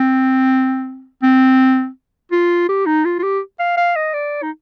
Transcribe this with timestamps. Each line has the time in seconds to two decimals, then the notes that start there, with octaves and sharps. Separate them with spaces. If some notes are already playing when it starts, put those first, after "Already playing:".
Already playing: C4
1.23 C4
2.32 F4
2.69 G4
2.86 D#4
3.05 F4
3.19 F4
3.23 G4
3.60 F5
3.77 F5
3.96 D#5
4.14 D5
4.42 D#4